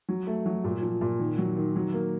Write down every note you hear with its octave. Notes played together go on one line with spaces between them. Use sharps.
F#3
A3
F#3
A#2
F3
A#2
D#3
F#3
D#3
F#3
A#3